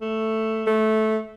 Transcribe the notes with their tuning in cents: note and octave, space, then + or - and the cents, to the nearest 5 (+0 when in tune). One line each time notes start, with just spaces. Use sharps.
A3 +5
A3 -15